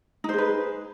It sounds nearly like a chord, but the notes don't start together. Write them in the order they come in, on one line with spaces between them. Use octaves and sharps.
D#4 C5 G#4 B4